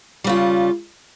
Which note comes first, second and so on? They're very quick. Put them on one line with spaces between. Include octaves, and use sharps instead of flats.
G3 C#3 F4